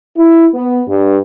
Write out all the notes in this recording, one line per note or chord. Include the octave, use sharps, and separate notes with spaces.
E4
B3
G2